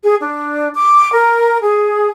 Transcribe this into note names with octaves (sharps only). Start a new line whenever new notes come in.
G#4
D4
D6
A#4
G#4